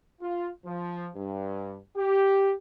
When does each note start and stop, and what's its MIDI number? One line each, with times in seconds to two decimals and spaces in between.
0.22 0.48 65
0.65 1.09 53
1.16 1.77 43
1.97 2.52 67